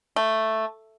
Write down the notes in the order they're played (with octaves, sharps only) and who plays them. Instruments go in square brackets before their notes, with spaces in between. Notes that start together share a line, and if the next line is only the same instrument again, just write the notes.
[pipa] A3